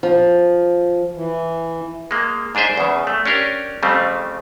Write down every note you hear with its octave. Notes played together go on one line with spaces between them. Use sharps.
F3
E3
G#3 A#3
G#2 D4 G#4 C5 E5
E2 C#3
A3
C#4 D4 G4 A#4
F2 C#3 G3 A3 C4